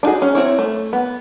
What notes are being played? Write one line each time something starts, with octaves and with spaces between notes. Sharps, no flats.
D4 D#4 F#4 G#4
C#4
C4 E4 C#5
A3
B3